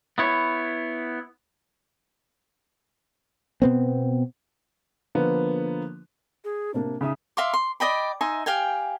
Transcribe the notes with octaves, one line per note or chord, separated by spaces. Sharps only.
B3 E4 C#5
B2 B3 C4
D3 F3 A#3 B3
G#4
C3 A#3 D4
C#3 D#4 E5 D#6
E5 F5 C6 D6
C6
D5 D#5 G5 B5
D#4 E5 G#5 C6
G4 F5 G5 G#5